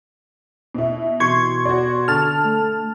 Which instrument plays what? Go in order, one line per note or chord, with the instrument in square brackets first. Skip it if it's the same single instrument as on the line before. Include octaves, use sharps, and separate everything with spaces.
[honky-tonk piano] B2 E4
[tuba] B2 [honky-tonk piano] E3 [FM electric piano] C6 C#6 G#6
[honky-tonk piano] F#4 D5
[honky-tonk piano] D3 [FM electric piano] A5 F6
[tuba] A3